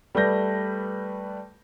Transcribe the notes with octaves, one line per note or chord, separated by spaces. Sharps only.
G3 A3 B4 G6 A#6